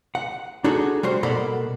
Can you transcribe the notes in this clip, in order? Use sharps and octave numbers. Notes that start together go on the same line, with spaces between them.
F#5
D4 D#4 F#4 G#4 A4
G3 F#4 C5
B2 A#3 A4 D5 F#5 B5